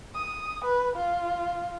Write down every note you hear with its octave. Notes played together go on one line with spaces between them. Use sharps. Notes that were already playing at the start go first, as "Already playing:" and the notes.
D#6
B4
F4